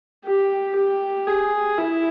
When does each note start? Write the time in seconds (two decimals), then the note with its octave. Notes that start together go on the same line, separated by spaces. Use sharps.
0.25 G4
0.76 G4
1.27 G#4
1.78 E4